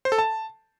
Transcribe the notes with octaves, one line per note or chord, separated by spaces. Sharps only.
C5
A4
A5